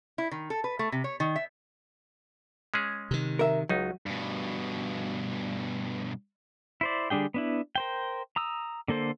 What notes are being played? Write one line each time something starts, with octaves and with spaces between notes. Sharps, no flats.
E4
D#3
A4
B4
A3
C3
C#5
D#3
E5
G#3 C#4 G#4
C3 D#3
A#4 E5
C#2 F#3 D#4
G2 B2
E4 C5 D5
D3 G3 D4 G#4 G5
B3 D4 E4
A#4 C5 G5
A#5 D#6 E6
D3 A#3 A4 C5